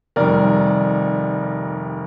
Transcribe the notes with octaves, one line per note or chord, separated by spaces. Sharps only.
F1 F2 D#3 G3 A#4 D5